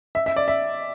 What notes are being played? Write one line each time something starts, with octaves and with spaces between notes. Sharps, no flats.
E5
E5
D5
E5